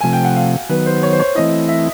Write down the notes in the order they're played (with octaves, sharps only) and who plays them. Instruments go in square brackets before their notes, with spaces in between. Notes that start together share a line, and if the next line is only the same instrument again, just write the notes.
[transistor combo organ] C3 F3 A3 [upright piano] G#5
[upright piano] G5
F#5
F5
[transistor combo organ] D#3 F#3 B3 [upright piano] B4
[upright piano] C5
C#5
C5
C#5
[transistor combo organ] E3 A3 C4 E4 [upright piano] D#5
[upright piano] E5